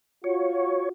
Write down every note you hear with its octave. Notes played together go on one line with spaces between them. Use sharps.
F4 F#4 C#5